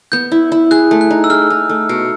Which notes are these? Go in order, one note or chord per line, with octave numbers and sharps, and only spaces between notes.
B3 G6
E4
E4
G#4 F#6
A3
F#6
D#4
E6
G#4 F6
D#4
A3
B2